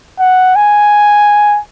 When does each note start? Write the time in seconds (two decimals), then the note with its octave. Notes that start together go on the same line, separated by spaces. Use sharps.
0.19 F#5
0.56 G#5